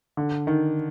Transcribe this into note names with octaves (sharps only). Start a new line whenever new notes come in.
D3
D#3